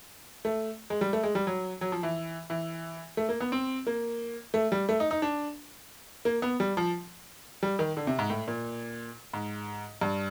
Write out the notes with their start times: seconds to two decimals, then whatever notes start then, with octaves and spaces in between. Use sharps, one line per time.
0.45 A3
0.90 G#3
1.01 G3
1.13 A3
1.23 G#3
1.35 G3
1.47 F#3
1.81 F#3
1.92 F3
2.03 E3
2.50 E3
3.17 A3
3.29 A#3
3.41 B3
3.52 C4
3.87 A#3
4.54 A3
4.72 G3
4.89 A3
5.00 D#4
5.11 D#4
5.22 D4
6.25 A#3
6.42 B3
6.60 G3
6.77 F3
7.63 G3
7.79 D#3
7.97 D3
8.07 C3
8.19 G#2
8.30 A2
8.48 A#2
9.33 G#2
10.01 G2